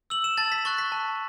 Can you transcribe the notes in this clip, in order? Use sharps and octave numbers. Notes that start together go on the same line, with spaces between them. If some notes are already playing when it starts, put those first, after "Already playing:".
E6 F#7
E7
A5 A6
B6
C#6 F#6 A6
B6
A5